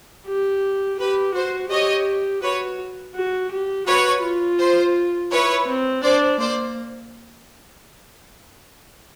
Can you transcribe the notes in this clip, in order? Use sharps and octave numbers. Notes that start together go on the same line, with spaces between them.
G4
G4 B4
F#4 C5
G4 C#5 D#5
F#4 B4 C#5
F#4
G4
F#4 B4 C#5
F4
C5
E4 B4 C#5
C4
D4 C5 D5
A#3 C5 D5